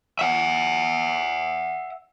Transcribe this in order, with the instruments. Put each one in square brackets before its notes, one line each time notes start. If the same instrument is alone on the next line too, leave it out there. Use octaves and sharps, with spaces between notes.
[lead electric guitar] E5 F#5